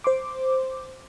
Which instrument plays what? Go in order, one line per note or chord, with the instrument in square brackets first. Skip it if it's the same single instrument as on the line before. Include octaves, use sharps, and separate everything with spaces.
[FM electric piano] C5 C6 D6